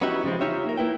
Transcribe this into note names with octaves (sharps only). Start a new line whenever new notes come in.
B3 C#4 D#4 E4 F#4 G4
C#3 F3 G#3 C4
D#4 F4 G4 C#5 E5
A#3 A#4
A#3 E4 B4 G5